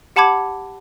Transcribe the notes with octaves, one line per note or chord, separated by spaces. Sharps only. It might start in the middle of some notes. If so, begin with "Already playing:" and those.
G4 F#5 A5 B5 D6 G#6